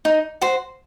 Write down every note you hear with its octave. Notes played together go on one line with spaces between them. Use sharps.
D#4
F#4 C5